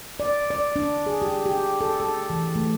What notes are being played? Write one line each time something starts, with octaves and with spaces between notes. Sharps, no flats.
D5
D5
D4
G#4
G4
G4
A4
A4
E3
A3